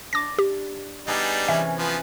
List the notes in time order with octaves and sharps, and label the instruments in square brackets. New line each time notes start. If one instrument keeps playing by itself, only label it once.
[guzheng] D4 [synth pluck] D6 A#6
[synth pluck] G4
[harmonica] G3 D4 D#4 [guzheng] B3 G#4
[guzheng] C3 E3 C#4 [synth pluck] E5
[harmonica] F3 B3